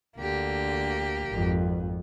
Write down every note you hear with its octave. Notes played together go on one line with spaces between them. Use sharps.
D2 D3 A#3 G4
G#1 F2